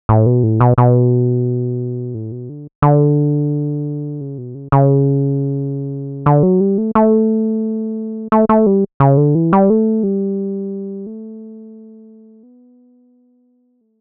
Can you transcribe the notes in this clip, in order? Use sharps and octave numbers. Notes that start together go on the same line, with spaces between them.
A2
B2
A2
B2
B2
A2
B2
D3
D3
C#3
B2
C#3
C#3
D3
F#3
G3
A3
A3
A3
A3
G3
C#3
D3
E3
G3
A3
G3
A3
B3
A3